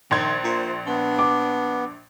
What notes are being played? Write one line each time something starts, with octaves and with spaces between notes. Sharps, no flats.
A#1 D#3 C6 G#6
A#2 C5
B3 D4
D6